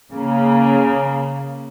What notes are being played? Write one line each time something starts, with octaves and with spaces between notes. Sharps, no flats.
C#3 A#3